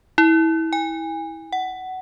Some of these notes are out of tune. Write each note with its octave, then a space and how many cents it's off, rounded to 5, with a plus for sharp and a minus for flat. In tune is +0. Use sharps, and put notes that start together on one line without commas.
E4 -25
G#5 -30
F#5 +15